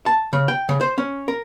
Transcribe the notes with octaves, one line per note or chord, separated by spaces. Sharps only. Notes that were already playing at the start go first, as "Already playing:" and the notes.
A5
C#3
G5
C#3
C5
C#4
A#4